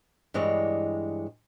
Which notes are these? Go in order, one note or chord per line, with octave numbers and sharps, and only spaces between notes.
G2 E3 G#3 D4 C#5 D#5